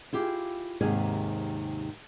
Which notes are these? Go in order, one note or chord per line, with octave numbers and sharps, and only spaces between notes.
E4 F4 G4 G#4
D#2 G#2 C3 D#3 G#4 G#5